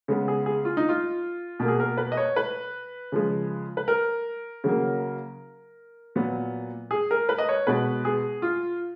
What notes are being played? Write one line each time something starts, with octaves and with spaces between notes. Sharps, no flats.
C#3 G#3 B3
G#4
G#4
F4
D#4
F4
B2 A#3
G#4
A#4
B4
D#5
C#5
B4
C#3 F3 G#3
B4
A#4
C#3 F#3 A#3
A#2 F#3 B3
G#4
A#4
B4
D#5
C#5
B2 G#3 B3 B4
G#4
F4